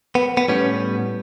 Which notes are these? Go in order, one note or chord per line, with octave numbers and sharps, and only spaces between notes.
B3
B3
A2 G3 B3 C#4